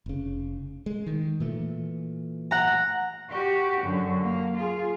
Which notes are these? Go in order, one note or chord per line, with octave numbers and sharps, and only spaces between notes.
F1 C#3
G#3
D#3
A#2 E3 A3
F#5 A#5
F#4 G4
F#2 D3
A#3
F4 G#4